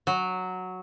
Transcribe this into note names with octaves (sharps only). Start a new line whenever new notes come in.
F#3